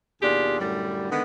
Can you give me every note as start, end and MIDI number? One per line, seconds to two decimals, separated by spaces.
0.22 0.58 39
0.22 0.58 47
0.22 0.58 62
0.22 0.58 65
0.22 0.58 67
0.22 0.58 68
0.60 1.08 42
0.60 1.08 45
0.60 1.08 50
0.60 1.08 55
1.10 1.22 50
1.10 1.22 51
1.10 1.22 56
1.10 1.22 59